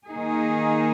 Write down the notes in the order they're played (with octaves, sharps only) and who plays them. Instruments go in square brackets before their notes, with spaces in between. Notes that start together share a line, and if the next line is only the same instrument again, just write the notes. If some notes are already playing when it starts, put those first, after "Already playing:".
[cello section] D#3 A#3 D#4 G#4